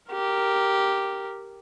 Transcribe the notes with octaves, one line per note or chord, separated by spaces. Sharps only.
G4 A#4